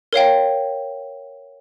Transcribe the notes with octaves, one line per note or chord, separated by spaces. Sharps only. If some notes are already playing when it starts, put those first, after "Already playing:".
A#4 C#5 F5 G5